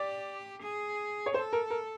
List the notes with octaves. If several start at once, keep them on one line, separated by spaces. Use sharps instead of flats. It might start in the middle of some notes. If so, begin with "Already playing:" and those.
Already playing: G4 D5
G#4
C#5
A4 C5
A#4
A#4